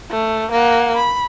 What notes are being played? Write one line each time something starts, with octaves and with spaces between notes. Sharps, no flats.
A3
A#3 F#5
B5